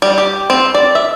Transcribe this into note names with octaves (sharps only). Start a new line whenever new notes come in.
G3
G4
C4
D5
E5